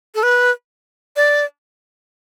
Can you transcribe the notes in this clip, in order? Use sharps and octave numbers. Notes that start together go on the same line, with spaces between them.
A4
B4
D5